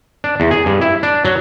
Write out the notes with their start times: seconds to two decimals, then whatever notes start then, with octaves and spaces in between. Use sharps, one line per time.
0.24 D4
0.40 E2
0.51 G#4
0.66 G2
0.81 E4
1.03 D4
1.25 F#3